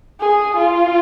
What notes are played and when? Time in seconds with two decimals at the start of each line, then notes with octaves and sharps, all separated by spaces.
0.21 G#4
0.57 F4